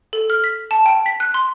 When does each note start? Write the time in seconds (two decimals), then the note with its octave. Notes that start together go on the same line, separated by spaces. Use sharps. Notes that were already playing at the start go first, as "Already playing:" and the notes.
0.13 A4
0.30 F6
0.44 B6
0.71 A5
0.86 G5
1.06 B6
1.20 F#6
1.34 C6